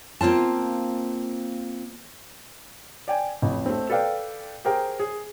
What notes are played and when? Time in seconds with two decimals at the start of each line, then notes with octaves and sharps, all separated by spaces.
0.21 A#3 C4 F4 A5
3.08 D5 G5 G#5
3.42 A1 F2
3.66 A3 C4
3.90 A4 B4 D5 F5 G5
4.65 G4 G#4 A#4 C5 G5
5.00 G#4